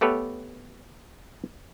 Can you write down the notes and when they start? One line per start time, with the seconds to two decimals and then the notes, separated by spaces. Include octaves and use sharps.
0.01 A3 B3 G4 A4 B4 C#5